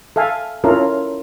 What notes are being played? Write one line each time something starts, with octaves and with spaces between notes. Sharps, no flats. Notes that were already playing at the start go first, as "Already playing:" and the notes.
A4 E5 F5 G#5
C#4 E4 F4 A4 A#4